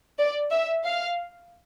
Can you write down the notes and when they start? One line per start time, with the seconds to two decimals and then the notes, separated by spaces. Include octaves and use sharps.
0.19 D5
0.52 E5
0.85 F5